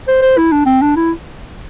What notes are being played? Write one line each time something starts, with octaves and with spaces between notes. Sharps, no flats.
C5
C5
E4
D4
C4
D4
E4